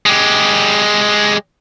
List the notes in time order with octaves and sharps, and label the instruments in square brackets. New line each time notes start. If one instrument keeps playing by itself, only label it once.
[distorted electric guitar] G#3 G4